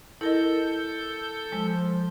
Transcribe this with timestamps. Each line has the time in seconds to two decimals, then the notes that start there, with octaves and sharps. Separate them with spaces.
0.21 E4 A4 A#4 D#5 G6
1.52 F3 G#3